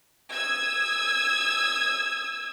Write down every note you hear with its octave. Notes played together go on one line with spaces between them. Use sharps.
D#6 E6 G#6